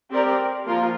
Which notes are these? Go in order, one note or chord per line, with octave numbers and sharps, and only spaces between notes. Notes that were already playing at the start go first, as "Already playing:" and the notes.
C4 G4 A#4 D5
F3 A#3 F4 A#4